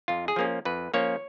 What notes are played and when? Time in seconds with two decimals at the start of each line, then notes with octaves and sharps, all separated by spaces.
0.08 F2 F4
0.28 G#4
0.36 F3 A#3 C#4
0.65 F2 B4
0.94 F3 A#3 C#4 C#5